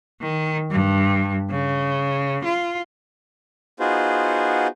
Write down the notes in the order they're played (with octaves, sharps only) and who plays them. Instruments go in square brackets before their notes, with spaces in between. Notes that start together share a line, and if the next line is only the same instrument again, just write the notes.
[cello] D#3
G2
C#3
F4
[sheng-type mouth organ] B3 D#4 F4 F#4 G#4 C5